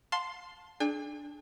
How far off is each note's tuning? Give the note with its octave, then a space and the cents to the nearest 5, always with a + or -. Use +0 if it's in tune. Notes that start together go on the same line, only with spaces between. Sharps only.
F5 +40 A5 +0 C6 +0
D4 +5 G#4 +45 G#5 -45